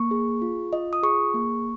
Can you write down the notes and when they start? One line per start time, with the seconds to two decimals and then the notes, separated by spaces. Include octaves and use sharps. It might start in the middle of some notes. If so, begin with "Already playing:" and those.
Already playing: A#3 C#6
0.11 G#4
0.42 F4
0.73 F4 D#5
0.93 D#6
1.03 G#4 C#6
1.34 A#3